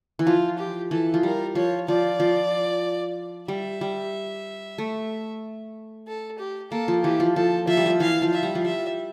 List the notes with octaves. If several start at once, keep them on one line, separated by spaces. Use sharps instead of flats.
E3
F3 F4
G4
E3 A4
F3
G3 A#4
F3 C#5
F3 D5
F3
G3 E5
G3
A3
A4
G4
A#3 A4
F3
E3 G4
F3
F3 A4
F3 E5
G3
F3
E3 F5
F3
E5
G3
F3
G3 E5